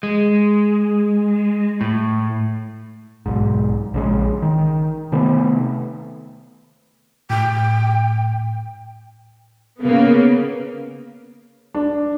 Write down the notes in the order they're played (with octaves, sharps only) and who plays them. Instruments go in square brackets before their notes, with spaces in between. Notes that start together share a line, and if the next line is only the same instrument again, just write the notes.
[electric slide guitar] G#3
A2
[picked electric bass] B1 G#2
A#1 C#3 G#3
D#3
C3 D#3 A3 B3
[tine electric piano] A2 [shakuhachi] G5
[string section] C#3 A#3 B3
[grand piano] D4